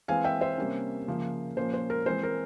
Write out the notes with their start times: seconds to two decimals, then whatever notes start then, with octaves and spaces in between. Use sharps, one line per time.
0.08 E3 G#3 C4 F5 G#5
0.24 E5 G5
0.41 C5 E5
0.58 C3 G3 A#3 C#4
1.08 C#3 F3 A#3
1.57 A#2 F3 A#3 C#4 C5
1.74 C5
1.90 A#4
2.06 E3 G#3 C4 C5
2.23 A#4